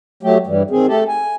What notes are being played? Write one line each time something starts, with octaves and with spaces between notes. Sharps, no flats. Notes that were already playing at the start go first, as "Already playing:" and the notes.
F#3 A3 G4
G2 E3 G3
D#3 C4 G#4
A3 G4 A4
G#5